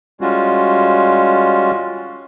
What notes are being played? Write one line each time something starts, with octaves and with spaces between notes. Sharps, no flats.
G3 G#3 C#4 F4 F#4